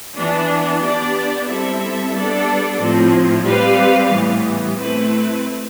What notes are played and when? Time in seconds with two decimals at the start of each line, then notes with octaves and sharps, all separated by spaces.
0.16 E3 B3 D4
0.82 B3 D4 G4 D5
1.48 G3 C4 E4 A4 E5
2.14 G3 B3 D4 A4 D5
2.79 A2 F3 C4
3.45 G3 C4 G4 B4 F5
4.11 A2 E3 G3 B3
4.78 A3 C4 E4 B4